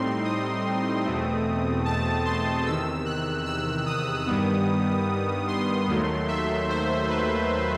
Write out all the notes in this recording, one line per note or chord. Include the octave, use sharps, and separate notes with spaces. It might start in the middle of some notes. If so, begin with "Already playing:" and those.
Already playing: A2 G3 C4 D#4 C6
D#6
E2 B2 A3 C4
A5
C6
E2 C3 D#3 E6
F#6
E6
D#6
G2 D#3 G3 B3
C6
D#2 D#3 F#3 A3
E5
C5
B4